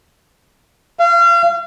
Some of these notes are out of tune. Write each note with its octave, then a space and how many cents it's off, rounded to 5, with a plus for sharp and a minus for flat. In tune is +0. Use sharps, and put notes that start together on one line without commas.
F5 -35